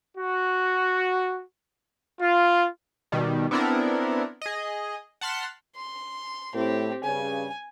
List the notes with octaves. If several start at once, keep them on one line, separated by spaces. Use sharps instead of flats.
F#4
F4
B2 D#3 G3
B3 C4 D4 E4 A4 A#4
G#4 D#5
F#5 A5 C6 F6 B6
C6
A2 C4 G4
G2 C#3 G#5